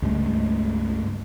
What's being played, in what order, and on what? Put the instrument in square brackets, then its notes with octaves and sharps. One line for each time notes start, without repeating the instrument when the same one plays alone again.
[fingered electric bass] C#2 G2 G#3 A3